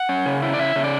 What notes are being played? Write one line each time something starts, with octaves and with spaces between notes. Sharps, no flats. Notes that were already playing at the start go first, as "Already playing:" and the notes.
Already playing: F#5
C#4
C#3
E4
D5
C#3 E5
C#3
D5